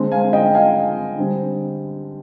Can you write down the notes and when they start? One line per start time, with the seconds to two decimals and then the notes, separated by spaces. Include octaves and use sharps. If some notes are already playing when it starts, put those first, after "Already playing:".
Already playing: D3 G#3 C4
0.12 F5 G#5
0.33 D#5 G5
0.54 F5 G#5
1.18 D3 G3 C4